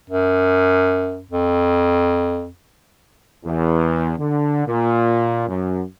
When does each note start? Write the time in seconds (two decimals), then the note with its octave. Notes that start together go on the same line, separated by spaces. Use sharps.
0.10 F#2
1.31 F2
3.45 E2
4.19 D3
4.67 A#2
5.48 F#2